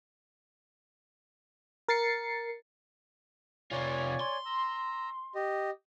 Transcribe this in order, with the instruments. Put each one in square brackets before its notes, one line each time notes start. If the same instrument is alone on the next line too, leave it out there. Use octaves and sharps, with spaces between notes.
[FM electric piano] A#4 A6 C7 C#7
[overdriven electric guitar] C3 F4 [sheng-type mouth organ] C#5 D5 G#5
[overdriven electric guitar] C6
[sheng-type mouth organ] A#5 E6
G4 D#5